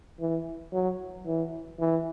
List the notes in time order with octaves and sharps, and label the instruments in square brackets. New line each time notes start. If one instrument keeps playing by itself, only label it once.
[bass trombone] E3
F#3
E3
E3